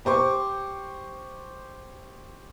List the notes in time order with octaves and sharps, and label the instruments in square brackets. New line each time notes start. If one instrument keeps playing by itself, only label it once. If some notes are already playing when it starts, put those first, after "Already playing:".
[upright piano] G4 C5 C#6 D6